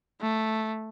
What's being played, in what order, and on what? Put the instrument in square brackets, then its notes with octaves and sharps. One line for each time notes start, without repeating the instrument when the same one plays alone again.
[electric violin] A3